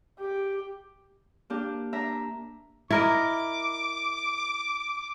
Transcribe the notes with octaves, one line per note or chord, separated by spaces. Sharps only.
G4
A#3 D4 G4
D4 E5 A#5
E4 A#4 D#5 D6